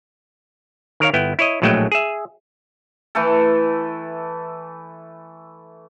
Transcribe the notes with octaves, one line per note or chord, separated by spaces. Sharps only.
D#3 A#4 C#5 F5
G1 B3 E4 G5
E4 C#5 D#5
A#1 A2 F#3 G#3 A3 G5
G#4 E5
E3 A3 A4